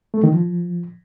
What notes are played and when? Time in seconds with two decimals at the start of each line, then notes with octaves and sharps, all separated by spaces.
0.14 A3
0.24 D#3
0.33 F3